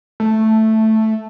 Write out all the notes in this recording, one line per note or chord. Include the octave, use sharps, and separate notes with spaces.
A3